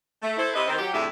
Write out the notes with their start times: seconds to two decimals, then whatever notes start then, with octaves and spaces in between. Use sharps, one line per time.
0.23 A3
0.37 E4 A4 C5
0.54 C3 B4 D#5
0.67 D#3 C4
0.79 F#3 G4
0.93 F2 A2 D3 G4 G#4 E5